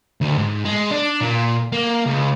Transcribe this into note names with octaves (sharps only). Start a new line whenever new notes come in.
D2
G#2
G#3
D4
A#2
A#3
C#2